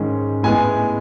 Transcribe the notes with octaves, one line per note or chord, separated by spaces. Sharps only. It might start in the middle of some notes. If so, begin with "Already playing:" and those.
Already playing: G#2 D#3 G#3 C#4
A2 G#3 B3 G#5